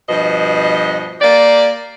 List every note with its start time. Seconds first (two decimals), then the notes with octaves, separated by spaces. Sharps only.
0.08 G2 B2 F3 D#5
1.20 A#3 G4 D5